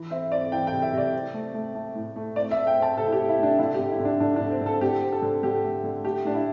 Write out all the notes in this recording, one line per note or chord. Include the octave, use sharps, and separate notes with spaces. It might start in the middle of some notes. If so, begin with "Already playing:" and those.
Already playing: E3
C4 E5
C4 D5
E3 G5
G5
C3
E5
C3 D5
C4
A3
A3
A3
A2
A3
C4 D5
E5
A3
G5
C4
A5
C3 A4
E4
G4
A3
E4
A3 D4
D3 E4
G4
D3
E4
D3
D4
D3 D4
D4
D3
C4
D3
A4
D3 G4
C4
A4
D3
D3 G4
A3
D3
A3 G4
A2 D4
E4